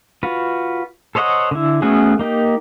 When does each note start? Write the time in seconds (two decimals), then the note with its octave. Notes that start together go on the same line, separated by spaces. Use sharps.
0.23 F4 F#4 B4
1.15 A4 C5 C#5 D#5 F#5
1.51 D3 E4
1.82 A3 B3 C#4 F#4 G#4
2.19 A#3 D#4 G4